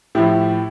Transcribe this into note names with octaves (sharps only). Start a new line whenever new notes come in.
A2 F3 E4 G4